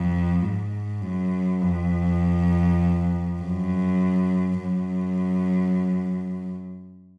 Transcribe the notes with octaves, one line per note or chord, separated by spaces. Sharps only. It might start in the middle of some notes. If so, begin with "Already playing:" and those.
Already playing: F2
G#2
F#2
F2
F#2
F#2